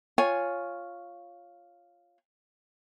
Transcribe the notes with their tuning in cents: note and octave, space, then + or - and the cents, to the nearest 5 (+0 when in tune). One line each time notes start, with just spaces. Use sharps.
F4 +0 C#5 +0 G#5 +0